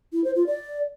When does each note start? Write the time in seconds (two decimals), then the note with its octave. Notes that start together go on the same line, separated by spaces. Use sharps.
0.13 E4
0.24 C5
0.35 F4
0.47 D5